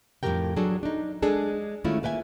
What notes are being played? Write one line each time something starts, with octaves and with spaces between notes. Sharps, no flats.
F2 A2 F#3 G4 A#4 G5
F#3 D4 G#4 A4
D4 D#4
G#3 D4 G#4 A4
D#3 G#3 A3 C#4 E4 F4
A#3 B4 E5 G5 G#5